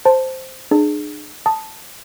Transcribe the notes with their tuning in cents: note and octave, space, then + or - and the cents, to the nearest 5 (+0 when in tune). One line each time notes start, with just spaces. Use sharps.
C5 +0 A5 +0
D4 +40 G#4 +15
A5 +0 D#6 +0